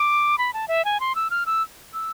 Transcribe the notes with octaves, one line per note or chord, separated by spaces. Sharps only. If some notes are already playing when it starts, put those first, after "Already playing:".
Already playing: D6
B5
A5
E5
G#5
C6
E6
F6
E6
E6